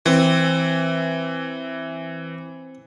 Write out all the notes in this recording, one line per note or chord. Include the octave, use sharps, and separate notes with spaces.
E3 C4